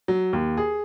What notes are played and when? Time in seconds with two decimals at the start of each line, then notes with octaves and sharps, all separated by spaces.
0.08 F#3
0.33 D#2
0.57 G#4